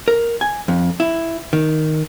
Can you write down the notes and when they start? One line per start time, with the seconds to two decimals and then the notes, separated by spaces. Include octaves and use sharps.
0.08 A#4
0.41 G#5
0.68 F2
1.00 E4
1.53 D#3